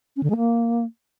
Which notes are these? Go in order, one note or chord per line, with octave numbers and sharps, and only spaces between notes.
C#4
D3
G#3
A#3